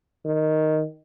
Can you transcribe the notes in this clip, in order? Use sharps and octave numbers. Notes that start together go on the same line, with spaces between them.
D#3